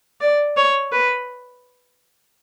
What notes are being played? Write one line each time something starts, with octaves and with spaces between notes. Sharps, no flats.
D5
C#5
B4